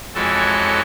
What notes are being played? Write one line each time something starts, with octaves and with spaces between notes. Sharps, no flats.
F2 E3 G#3 F#4 A4 C#5